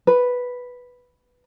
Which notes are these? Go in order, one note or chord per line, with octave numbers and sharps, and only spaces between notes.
B4